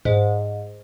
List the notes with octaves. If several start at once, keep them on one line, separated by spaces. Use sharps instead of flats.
G#2